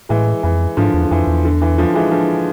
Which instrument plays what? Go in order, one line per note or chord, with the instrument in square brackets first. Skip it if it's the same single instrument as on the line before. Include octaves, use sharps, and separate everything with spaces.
[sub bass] A2 [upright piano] E3 G#3
[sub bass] F2 [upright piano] E3
[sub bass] G#2 [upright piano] D3 F3
[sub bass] E2
[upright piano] D3
[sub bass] F2 [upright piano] E3
[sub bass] E2
[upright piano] D3
E3
D3 F3
E3 G#3
D3 F3